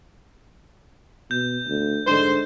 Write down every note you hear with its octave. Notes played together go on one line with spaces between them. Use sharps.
B2 G6
D2
G#2 D3 G#3 D4 C5